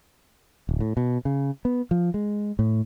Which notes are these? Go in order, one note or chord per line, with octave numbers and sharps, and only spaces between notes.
D1
A2
B2
C#3
B3
F3
G#3
A2